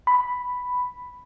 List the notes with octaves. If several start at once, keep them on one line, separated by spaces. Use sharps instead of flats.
B5